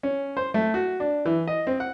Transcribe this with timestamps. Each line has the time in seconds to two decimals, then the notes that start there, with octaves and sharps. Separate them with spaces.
0.03 C#4
0.37 C5
0.54 A3
0.74 F#4
1.00 D4
1.25 E3
1.48 D#5
1.67 C4
1.80 F#5